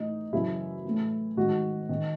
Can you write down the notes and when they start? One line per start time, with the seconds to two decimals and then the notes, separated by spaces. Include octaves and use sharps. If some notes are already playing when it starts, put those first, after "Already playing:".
Already playing: A2 E3 D#4
0.33 F#2 C#3 E3 E4
0.85 A2 E3
1.37 G#2 D#3 F#4
1.89 D#3